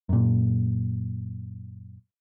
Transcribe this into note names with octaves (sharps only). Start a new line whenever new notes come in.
F#2 A#2